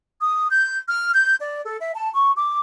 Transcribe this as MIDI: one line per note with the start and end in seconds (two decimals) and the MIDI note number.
0.21 0.48 87
0.50 0.77 91
0.88 1.11 89
1.13 1.36 91
1.39 1.61 74
1.65 1.77 69
1.79 1.93 76
1.95 2.11 81
2.15 2.33 85
2.37 2.60 86